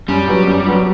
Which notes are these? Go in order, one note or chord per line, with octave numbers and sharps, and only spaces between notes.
F#2 G3
F#3 B3 F#4
F#2
F#3 B3 F#4